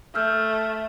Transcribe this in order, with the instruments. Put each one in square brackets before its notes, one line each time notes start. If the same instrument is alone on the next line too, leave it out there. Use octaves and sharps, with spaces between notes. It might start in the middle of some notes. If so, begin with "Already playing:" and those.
[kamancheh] A3 [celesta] E6 F6 G6